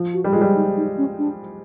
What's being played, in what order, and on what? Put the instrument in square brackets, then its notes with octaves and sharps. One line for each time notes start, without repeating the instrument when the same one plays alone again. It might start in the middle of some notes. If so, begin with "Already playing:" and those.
Already playing: [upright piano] F3
[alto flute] F#4
[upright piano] G3
[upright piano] G#3 [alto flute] F4
[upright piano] G3
[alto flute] D#4
D#4
C#4
D4